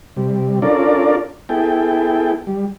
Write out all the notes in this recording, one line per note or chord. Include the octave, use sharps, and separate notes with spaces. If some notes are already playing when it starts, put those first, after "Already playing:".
C3 G3
C#4 D4 F4 A4 A#4 D5
B3 E4 G#4 A4 G5
G3